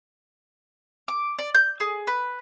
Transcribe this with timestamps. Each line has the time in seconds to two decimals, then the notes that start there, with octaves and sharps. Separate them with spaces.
1.08 D6
1.39 D5
1.55 G6
1.80 G#4
2.07 B4